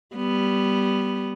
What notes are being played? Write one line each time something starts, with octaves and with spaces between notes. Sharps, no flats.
G3 B3